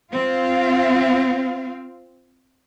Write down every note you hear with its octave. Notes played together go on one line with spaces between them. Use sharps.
C4 F4 F5